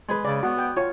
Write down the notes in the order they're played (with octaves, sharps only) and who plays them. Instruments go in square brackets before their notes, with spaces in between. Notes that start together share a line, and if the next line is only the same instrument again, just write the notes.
[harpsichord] G#3 G#4 B4
[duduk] C#3 [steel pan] D5
[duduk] B3 [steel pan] F#4
[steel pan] G5
[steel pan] F4 [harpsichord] C#5